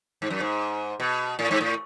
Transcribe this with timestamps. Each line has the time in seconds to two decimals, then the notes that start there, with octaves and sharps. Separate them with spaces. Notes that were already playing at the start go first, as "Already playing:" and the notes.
0.22 G#2
0.30 F#2
0.40 G#2
1.00 B2
1.39 A2
1.51 G#2
1.61 A2